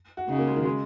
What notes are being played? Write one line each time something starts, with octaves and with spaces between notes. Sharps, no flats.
F#4
C#3 D#4
A#3
G#3
D#3
G#3